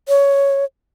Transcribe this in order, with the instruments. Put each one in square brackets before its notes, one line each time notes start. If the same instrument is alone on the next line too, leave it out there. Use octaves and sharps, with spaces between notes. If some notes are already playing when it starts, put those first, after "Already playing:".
[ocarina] C#5